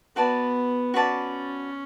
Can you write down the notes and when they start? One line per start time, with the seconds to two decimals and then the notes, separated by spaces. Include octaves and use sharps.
0.16 B3 F#4 B4 D5 A5
0.94 C#4 F#4 B4 D5 A5